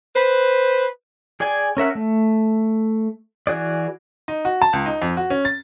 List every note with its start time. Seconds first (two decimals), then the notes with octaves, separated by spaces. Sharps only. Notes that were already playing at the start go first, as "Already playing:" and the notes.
0.15 B4 C5
1.40 G#4 D5 G5 G#5
1.77 C#4 A#4 E5 F#5
1.95 A3
3.47 E3 F#4 G#4 D5
4.28 D#4
4.45 F#4
4.62 A5
4.73 C#2
4.86 D#4
5.02 F2
5.17 F#4
5.30 C#4
5.45 A6